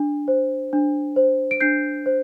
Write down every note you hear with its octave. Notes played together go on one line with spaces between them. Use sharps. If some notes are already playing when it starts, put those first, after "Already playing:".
Already playing: D4
C5
D4
C5
D7
D4 G6 C7
C5